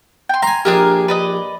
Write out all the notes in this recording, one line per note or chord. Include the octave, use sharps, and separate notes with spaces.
G5 C6
G#5 A#5 C6
A#1 D4 G4 G#4 A#4
B4 D5 D#5